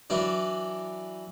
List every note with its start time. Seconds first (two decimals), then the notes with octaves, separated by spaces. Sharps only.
0.10 E3 F#3 D4